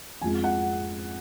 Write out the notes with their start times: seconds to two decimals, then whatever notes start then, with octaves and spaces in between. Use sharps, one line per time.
0.21 F2 F3 G#3 G#5
0.44 F#5